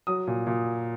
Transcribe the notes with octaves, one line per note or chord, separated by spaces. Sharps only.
F#3 D#6
A#2
A#2